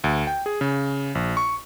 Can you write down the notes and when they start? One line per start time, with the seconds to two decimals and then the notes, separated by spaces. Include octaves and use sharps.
0.04 D2
0.27 G5
0.46 G#4
0.61 C#3
1.15 A#1
1.37 C#6